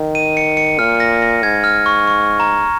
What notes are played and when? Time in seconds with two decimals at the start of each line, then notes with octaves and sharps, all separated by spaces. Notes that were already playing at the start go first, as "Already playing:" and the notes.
Already playing: D#3
0.15 D#7
0.37 C#7
0.57 C#7
0.79 A#2 F6
1.00 A#6
1.22 A#6
1.43 G#2 G#6
1.64 F6
1.86 C#6
2.07 C#6
2.40 A#5